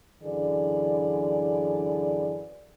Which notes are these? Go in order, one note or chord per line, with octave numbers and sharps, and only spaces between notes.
F#2 D3 E3 G#4 D5